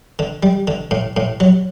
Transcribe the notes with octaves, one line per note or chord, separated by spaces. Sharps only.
D3
G3
D3
A2
A2
F#3